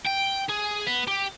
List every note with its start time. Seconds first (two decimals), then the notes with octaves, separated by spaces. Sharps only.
0.07 G5
0.49 G#4
0.87 B3
1.08 G4